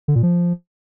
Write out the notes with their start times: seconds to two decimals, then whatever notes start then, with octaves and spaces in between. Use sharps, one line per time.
0.08 D3
0.15 A#2
0.23 F3